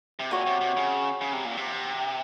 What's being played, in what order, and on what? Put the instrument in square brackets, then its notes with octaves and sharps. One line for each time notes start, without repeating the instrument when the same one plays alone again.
[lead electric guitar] C3
[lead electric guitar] A#2 [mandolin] F#4 C#5 G#5
[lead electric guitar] C3
C3
C#3
C#3
C3
A#2
C3